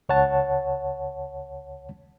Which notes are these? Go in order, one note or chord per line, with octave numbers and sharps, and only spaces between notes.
C#2 C#5 F#5 A5